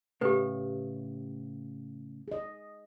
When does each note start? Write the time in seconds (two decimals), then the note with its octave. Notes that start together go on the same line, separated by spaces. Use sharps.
0.21 A2 C#3 G4 B4
2.28 G#4 D#5